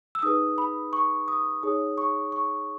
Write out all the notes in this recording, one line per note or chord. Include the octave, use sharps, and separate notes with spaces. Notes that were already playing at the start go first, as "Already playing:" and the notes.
E6
D#4 G#4 B4 D#6
B5
C#6
D#6
D#4 G#4 C#5 D#6
C#6
C#6